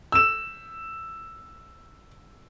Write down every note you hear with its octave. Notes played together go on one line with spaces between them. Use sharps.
E6 E7